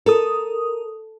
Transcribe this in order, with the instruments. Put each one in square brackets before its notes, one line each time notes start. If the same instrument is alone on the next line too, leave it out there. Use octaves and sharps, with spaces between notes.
[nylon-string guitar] A4 [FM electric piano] A#4 D#6